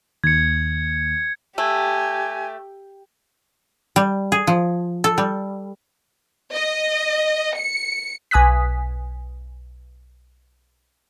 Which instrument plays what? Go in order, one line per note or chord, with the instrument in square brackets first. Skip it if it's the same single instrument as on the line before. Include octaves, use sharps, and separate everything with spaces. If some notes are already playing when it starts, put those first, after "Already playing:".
[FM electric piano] D#2 [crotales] G#6 C#7
[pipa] A3 [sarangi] G4 [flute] G#5
[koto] G3
G#4
F3
A4
G3
[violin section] D#5
C#7
[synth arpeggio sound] B1 G#5 D#6 F#6 B6